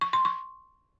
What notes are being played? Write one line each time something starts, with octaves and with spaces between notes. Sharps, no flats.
C#6
C6
C#6